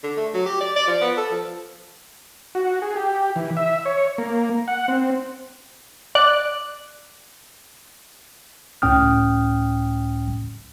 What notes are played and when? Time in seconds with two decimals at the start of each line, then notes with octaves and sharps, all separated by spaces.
0.04 D3
0.17 A3
0.34 F#3
0.46 G4
0.61 D5
0.76 D5
0.88 F3
1.01 B3
1.17 A4
1.32 F3
2.55 F#4
2.82 G#4
2.96 G4
3.36 E3
3.57 E5
3.85 C#5
4.18 A#3
4.68 F#5
4.88 C4
6.15 D5 F#6
8.82 C#2 A2 C#4 G5 D#6 F6